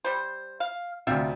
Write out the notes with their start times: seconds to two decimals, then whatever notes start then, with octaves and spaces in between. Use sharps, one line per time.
0.05 G3 C5
0.60 F5
1.07 D2 C3 F4 E5 G5